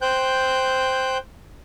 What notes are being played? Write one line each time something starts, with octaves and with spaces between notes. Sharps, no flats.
C5 G5 F#6 G6